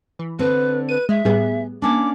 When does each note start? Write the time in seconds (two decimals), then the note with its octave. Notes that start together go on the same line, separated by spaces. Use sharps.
0.19 E3
0.39 D3 C4 B4
0.89 B4 D#7
1.09 G#3 E5
1.25 A2 G3 B3 G#4
1.82 A#3 C#4 D4 D6